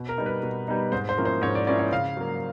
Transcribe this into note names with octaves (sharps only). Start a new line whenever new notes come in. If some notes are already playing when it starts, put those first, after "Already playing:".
Already playing: B2
A#4
G3 B3 D#4
B4
B2
G3 B3 D#4
G#2 C5
C5
F3 A#3 C#4 E4
C5
G#2 C#5
D5
F3 A#3 C#4 E4 D5
C#5
C#3 F5
F#3 A#3